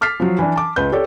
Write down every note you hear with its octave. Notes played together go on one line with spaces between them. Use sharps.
D6 F6 A6 B6 C7
F3 F#3
E3 D4
A5 D6
C#2 B4 G6
G4 A4 C#5 D5